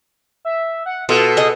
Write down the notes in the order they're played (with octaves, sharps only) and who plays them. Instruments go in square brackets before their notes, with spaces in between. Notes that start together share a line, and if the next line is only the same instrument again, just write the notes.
[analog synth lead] E5
F#5
[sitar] B2 [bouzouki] F4 [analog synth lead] A4
[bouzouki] G#4 D#5